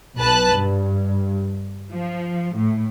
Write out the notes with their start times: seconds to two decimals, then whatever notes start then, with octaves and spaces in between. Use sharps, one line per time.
0.16 B1 B4 A5 F#6
0.54 G2
1.92 F3
2.54 A2